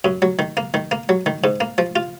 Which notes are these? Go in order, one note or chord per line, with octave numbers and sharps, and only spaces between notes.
F#2
F#3
D#3
A#3
D#3
A#3
F#3
D#3
G#2
A#3
F3
F4